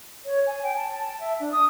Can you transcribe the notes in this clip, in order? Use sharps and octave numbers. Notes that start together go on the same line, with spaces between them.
C#5
G#5
G5
A5
A5
E5
D4
D#6